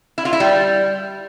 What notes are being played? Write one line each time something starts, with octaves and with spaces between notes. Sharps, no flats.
E4
F4
E4
G3